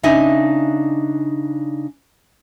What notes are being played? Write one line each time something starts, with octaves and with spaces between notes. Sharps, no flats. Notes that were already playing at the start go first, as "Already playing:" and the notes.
C#3 D4 D#4 D#5 E5 G#5